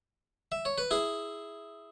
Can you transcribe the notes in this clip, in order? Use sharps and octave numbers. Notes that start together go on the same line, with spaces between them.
E5
C#5
B4
E4 G#4